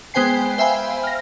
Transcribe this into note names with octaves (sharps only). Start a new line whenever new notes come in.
G#3 B3 C5 G5 G#5 C7
C5 E5 F5 G5 G#5 B5
F6 A#6